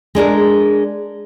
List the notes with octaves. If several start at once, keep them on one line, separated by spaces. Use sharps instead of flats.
G#3 D4 G#4 A#4